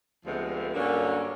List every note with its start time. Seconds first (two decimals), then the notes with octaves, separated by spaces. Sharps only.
0.24 D2 C3 F3 G#3 B3
0.73 G2 D3 F#3 A#3 C#4